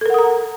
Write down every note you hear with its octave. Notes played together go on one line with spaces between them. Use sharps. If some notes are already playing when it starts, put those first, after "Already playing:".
A4 A#4 F#5 A#5 D#6